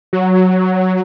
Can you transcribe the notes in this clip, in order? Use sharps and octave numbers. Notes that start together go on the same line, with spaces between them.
F#3